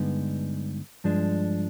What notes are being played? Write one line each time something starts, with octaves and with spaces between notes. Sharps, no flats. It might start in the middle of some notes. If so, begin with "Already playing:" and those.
Already playing: G2 D3 G#3 B3 D#4
G2 F3 G#3 D4